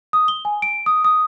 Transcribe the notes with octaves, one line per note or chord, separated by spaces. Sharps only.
D#6
G7
G#5
D7
D#6
D#6